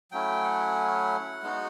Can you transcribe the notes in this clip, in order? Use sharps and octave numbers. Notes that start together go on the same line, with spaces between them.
F#3 A3 C#4 E4 G5
F#5
G#3 B3 D#4 F#4